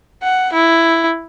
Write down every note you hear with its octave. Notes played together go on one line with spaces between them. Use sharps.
F#5
E4